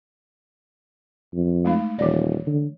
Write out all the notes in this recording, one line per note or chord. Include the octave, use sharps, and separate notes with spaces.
F2
G#3 A3 D#4
D#1 E3 D5
D3